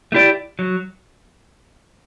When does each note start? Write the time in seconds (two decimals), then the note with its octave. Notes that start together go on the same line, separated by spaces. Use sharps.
0.12 A3 E4 G4 D5
0.59 F#3